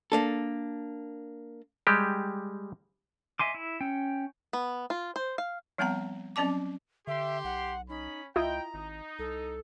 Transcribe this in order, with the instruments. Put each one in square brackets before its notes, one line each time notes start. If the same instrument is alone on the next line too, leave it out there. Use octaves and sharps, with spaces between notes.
[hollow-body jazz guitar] A#3 D4 A4
[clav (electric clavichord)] G3 G#3 G4
[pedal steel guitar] D#5 E5 G#5 C6 D6
E4
C#4 G5
[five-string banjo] B3
F4
C5
F5
[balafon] F3 G3 B3 C4 F#5 A#5
F#3 C4 C#4 D5 A5 D6
[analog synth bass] D3 [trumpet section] G4 C6 [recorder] E5
[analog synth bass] B1 [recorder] F#5
[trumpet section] C#4 B5 [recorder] D#4
[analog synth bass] C#2 [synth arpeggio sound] E4 F4 D#5 [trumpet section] G5 [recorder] A#5
[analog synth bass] G#1 [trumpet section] D#4
[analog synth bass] C2 [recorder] A4